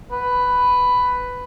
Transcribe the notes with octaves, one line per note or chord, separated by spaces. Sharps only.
B4